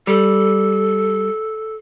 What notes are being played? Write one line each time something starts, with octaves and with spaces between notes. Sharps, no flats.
G3 A4